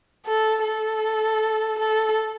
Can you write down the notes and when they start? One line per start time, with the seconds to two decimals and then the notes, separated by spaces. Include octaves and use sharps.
0.26 A4
0.64 A4
1.79 A4